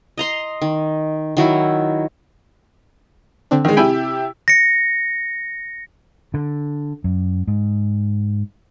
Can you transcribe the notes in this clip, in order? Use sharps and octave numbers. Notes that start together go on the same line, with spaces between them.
D#5 A#5 C6
D#3
D#3 F#3 E4
D3 C4 D4
D#3 G#3
C3 E4 G4 G5 G#5 B5
A#6 C#7
D3
F#2
G#2